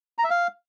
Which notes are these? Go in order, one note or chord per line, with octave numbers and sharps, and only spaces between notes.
A#5
E5
F5